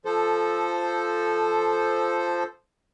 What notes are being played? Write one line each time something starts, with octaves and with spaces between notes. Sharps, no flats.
F3 A4 C5